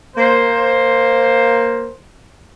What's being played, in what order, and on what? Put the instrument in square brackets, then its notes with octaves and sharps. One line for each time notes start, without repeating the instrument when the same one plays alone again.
[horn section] A#3 C5